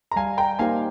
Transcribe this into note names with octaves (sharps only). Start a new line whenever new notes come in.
A#5
G3 F5 G#5
G5 A#5
A#3 D#4 G4 C5 F5 G#5